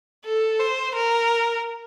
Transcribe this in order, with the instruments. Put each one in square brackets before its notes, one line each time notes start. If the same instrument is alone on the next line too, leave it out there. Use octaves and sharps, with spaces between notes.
[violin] A4
C5
A#4